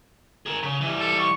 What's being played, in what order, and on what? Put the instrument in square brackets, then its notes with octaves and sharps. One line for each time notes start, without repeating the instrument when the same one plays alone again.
[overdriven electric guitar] G#4 A#4
C#3
E3 G3
[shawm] A4
C#6